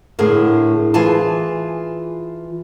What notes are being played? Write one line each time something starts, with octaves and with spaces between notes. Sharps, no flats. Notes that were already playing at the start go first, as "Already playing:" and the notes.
A2 D3 G#4 A#4
E3 F4 G#4 G#5 A5